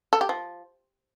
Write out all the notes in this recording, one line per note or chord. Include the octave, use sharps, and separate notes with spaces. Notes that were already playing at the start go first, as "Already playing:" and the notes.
A4
G4
F3